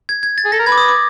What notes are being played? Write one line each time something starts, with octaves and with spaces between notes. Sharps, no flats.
G#6
G#6
A6
G#4
A4 A#6
A#4
B4 G#6
D6
D#6
D6